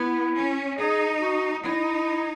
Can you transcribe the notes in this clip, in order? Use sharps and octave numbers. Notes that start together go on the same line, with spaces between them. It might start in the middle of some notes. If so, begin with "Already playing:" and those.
Already playing: B3 E4
C#4
D#4 G#4
F#4
D#4 E4